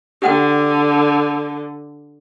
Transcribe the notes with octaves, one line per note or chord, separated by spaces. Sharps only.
D3 G4 F#5 G5